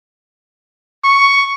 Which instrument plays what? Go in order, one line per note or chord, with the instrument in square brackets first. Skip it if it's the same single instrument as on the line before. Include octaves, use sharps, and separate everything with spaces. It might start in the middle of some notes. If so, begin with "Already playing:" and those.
[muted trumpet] C#6